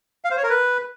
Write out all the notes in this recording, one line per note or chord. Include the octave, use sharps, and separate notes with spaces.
F5
C5
C#5
A#4
B4